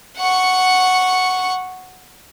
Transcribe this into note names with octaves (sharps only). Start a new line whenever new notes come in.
F#5 C#6